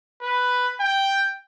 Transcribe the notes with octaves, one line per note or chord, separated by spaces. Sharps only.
B4
G5